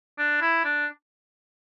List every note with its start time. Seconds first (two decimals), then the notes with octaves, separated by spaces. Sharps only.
0.18 D4
0.41 E4
0.64 D4